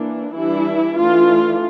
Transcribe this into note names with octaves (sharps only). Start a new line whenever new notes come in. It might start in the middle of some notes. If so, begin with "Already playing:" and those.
Already playing: E3 A#3 D4
E3 G3 D4 E4
E3 A3 D4 F4